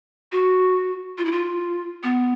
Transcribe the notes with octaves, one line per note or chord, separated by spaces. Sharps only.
F#4
F4
E4
F4
B3